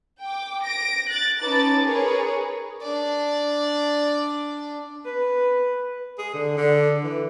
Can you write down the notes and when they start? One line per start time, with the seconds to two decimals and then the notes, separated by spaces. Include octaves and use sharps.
0.21 G5 D6
0.63 A#6 D7
1.09 F#6 A6
1.40 C#4 D#4 B4 A5 D6 A6
1.83 G#4 A#4 B4 C#5
2.81 D4 D5
5.05 B4
6.18 G#4
6.34 D3
6.57 D3
7.04 E3